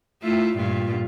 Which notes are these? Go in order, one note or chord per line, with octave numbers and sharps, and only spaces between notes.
A3 E4 F4
G2 A#2 F4